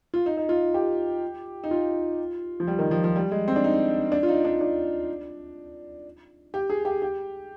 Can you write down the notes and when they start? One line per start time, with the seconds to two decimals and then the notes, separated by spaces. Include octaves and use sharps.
0.14 F4
0.26 D#4
0.37 D#4
0.49 F4
0.74 G4
1.64 D#4
1.71 F4
2.60 F3
2.68 G3
2.79 D#3
2.91 F3
3.04 F3
3.16 G3
3.31 G#3
3.48 C4
3.56 D4
3.64 D#4
4.12 D4
4.23 F4
4.28 D#4
4.45 D4
4.61 D4
6.54 G4
6.70 G#4
6.85 G4
7.02 G4